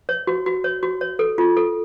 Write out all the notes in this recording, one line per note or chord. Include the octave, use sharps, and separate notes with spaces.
C#5
F#4
F#4
C#5
F#4
C#5
A4
F4
A4